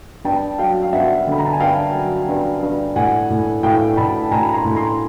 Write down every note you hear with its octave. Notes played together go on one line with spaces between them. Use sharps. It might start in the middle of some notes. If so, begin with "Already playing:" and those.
G2 G5 A5
F#3 F5 G5
F5
G2 E5 F#5
D3 B5
A#5
A5
G#5
G2 F5 G5
F#3
G2
G2
A2 F#5 G#5
A2
A2 F5 G5
A2 A5 B5
A2 G#5 A#5
B5
A#5 C6
A2
A#5 C6